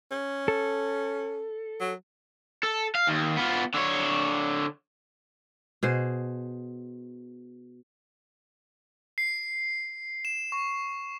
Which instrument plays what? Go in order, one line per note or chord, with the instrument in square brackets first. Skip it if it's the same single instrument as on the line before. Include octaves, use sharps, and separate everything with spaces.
[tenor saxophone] C#4
[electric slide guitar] A4
[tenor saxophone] F#3
[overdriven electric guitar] A4
F5
D#2
B3 F4
D3 C#5
[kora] B2 G#4 C5
[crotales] C7
E7
C#6